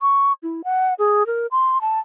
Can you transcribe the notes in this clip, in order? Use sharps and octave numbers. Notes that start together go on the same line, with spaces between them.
C#6
E4
F#5
G#4
A#4
C6
A5